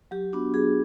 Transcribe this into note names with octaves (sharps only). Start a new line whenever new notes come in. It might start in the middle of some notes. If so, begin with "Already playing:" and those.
F#3 G4
B3 D4 F#4
F#3 G#4